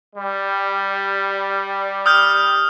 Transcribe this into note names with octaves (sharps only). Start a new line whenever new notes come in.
G3
D#6 F6 G6